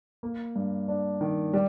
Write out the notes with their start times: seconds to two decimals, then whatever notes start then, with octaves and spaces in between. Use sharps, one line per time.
0.23 A#3
0.56 G2
0.88 D4
1.21 D#3
1.53 G3